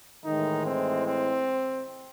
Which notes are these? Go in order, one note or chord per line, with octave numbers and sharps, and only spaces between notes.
A2 D#3 E3 G#3 D#4
C4
C4